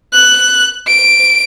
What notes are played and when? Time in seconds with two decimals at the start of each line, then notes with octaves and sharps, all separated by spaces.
0.13 F#6
0.87 D7